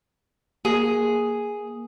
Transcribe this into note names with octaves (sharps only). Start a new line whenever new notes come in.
A#3 G#4